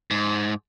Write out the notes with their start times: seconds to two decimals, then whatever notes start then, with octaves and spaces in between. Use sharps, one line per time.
0.11 G#2